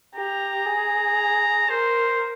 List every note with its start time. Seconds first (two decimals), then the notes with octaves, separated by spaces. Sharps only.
0.15 G4 A#5
0.66 G#4
1.69 A#4 C5